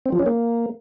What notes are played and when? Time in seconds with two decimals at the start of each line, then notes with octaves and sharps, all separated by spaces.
0.06 C4
0.12 F3
0.19 C#4
0.26 A#3